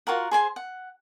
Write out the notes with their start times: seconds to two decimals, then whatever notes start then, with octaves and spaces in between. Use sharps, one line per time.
0.07 F4 F#4 A#4 F#5
0.31 G#4 C5 G#5 C6
0.56 F#5